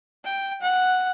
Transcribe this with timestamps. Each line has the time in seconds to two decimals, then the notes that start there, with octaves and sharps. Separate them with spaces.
0.24 G5
0.62 F#5